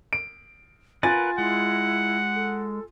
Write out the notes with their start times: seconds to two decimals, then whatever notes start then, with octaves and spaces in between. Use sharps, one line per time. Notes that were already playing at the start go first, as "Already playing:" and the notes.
0.13 D7
1.03 F4 A#4 B4 F#5 G#5 F#6 A6
1.38 G#3 E4 F#5
2.34 A4